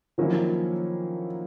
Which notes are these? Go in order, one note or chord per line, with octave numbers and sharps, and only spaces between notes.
D#3 F3 F#3 A#3 C#4 E4